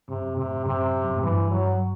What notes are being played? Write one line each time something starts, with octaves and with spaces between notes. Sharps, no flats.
G2 C3
F#2
A2 C3
A2
F#2 C3
F#2
A2
G2 E3
F#3